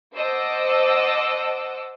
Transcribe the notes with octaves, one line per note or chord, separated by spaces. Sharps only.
C5 D#5 F#5 A5 D6 E6